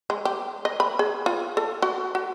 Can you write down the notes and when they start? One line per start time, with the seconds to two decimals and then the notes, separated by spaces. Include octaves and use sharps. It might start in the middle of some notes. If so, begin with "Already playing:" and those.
0.10 G#3
0.25 G4
0.65 D#5
0.80 B5
0.99 G#4
1.26 F4
1.57 A4
1.82 F#4
2.15 F#4